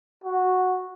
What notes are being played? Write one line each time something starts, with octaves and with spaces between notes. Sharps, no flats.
F#4